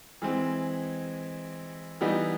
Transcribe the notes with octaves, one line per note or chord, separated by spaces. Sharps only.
E3 G#3 C4
E3 G3 B3 D#4